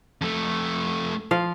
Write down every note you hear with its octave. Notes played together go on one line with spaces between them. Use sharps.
F2 A3
F3 F5